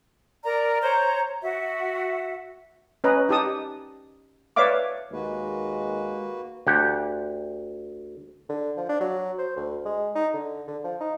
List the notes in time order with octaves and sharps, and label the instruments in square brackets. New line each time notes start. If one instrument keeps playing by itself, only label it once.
[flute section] A#4 D5 A#5
C5 C#5 A#5
F#4 E5 F#5
[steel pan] C#4 B4 D#5 A#5
D#4 G4 A5 D#6
B4 C#5 D5 E5 F5 D6
[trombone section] D#2 G#3 [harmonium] A#3 F#4 B4
[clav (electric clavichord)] D2 G4 F#5
[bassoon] D3
F3
D4
F#3
C5
D2
G#3
D#4
D3
D3
F3
D#4